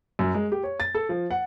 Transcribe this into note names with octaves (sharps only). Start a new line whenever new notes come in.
F#2
G#3
G4
C#5
A6
A4
F3
F#5